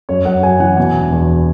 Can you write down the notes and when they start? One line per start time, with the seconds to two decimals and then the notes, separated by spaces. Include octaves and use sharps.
0.09 F#2 C#5
0.25 F#2 F#5
0.43 F#2 G#5
0.60 E3 F#5
0.77 B2 G#5
0.95 E1
1.12 E2